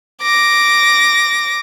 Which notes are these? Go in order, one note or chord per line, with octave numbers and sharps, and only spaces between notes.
D6 A#6